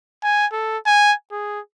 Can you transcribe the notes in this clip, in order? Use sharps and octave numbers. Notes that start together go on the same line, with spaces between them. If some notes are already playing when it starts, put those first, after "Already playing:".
G#5
A4
G#5
G#4